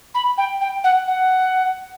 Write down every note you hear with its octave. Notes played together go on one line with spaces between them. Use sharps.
B5
G5
G5
F#5
F#5